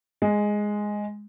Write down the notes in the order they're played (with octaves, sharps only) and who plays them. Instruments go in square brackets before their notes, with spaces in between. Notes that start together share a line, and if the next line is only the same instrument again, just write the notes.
[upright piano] G#3